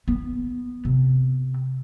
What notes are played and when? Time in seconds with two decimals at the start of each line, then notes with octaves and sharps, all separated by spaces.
0.08 B3
0.85 C3